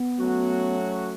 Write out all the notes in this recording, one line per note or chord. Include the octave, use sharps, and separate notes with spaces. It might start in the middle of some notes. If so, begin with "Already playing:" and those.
Already playing: B3
F#3 A3 C#4 F#4